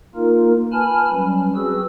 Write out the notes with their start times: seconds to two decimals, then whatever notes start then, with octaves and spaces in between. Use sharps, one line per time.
0.15 A#3 D#4 F4 A#4
0.72 B4 G#5 A5 B5 F6
1.11 F#3 G3 C#4
1.55 C4 F#4 G#4 B4 E6